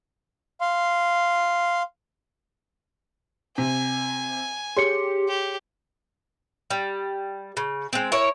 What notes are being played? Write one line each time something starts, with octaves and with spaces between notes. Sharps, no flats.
F5 C6
C3 G#5
G4 G#4 C#5 C6 C#7
G4
G3
C#3
G#3 C4
E4 A#4 C#5